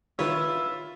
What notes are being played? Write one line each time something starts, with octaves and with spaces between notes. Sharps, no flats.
D#3 F4 B4 C#5 E5